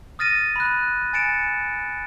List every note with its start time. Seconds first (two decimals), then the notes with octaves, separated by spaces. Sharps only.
0.19 D#6 F6 A6 A#6 D#7
0.56 B5 F#6
1.13 G#5 A6 C#7 D7 E7